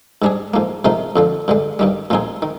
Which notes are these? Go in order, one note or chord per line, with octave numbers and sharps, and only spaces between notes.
G#2 G3 D4 G#4
G#2 F3 A#3
C3 F3 G#3 D#4 A#4
F2 D3 F3
G2 D3 G#3
G2 D#3 G3
A#2 F3 C4 D#4 G#4
D#3